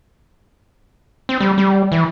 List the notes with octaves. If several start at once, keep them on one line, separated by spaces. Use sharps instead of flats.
C4
G3
G3
E3